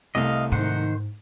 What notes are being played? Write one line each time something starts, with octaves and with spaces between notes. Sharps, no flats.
C2 A3 D#5 F5
G#2 D#3 C5 F#5